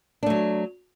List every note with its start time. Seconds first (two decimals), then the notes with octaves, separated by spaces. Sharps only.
0.23 D4
0.26 A3
0.30 F#3